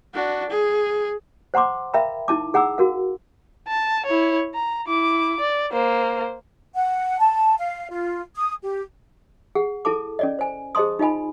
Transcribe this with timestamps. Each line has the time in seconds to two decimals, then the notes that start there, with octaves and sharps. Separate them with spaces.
0.14 D4 F#4
0.49 G#4
1.54 C5 F#5 A#5 C6 D6
1.94 A#4 E5 F5 G5 A#5 B5
2.28 D#4 E4 A5 D6
2.54 G#4 F#5 A#5 D6 E6
2.78 F#4 A#4 F5
3.68 A5
4.06 E4 C#5
4.54 A#5
4.87 E4 D6
5.40 D5
5.72 A#3 C5
6.75 F#5
7.20 A5
7.58 F5
7.90 F4
8.36 D#6
8.63 G4
9.55 G#4 F#5
9.85 E4 A4 A5 D6
10.19 C#4 D5 D#5
10.39 C5 G#5
10.75 G#4 C5 D#5 A5 C6 D#6
10.99 D#4 F4 D#5 G#5 B5